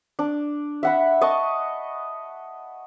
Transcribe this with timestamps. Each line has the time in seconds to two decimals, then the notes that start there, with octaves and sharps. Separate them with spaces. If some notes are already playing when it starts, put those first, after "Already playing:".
0.19 D4
0.83 E5 F#5 B5
1.21 D#5 A5 C#6